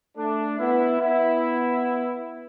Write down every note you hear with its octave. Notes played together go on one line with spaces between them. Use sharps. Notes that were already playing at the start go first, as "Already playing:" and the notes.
A3 D4
B3 E4
B3 E4